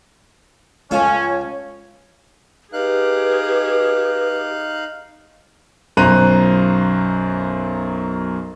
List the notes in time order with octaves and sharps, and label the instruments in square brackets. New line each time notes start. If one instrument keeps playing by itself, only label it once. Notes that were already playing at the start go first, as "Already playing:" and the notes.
[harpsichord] C#2 F3 A4 [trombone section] C#4 [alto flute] C#5
[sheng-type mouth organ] D#4 F5 F#6 [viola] G4 G#4 [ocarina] B4
[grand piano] B1 F#2 C5 A#5 F#6 D#7